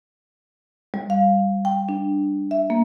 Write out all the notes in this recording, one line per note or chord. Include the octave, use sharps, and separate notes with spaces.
G3
F5
G5
D4
E5
A#3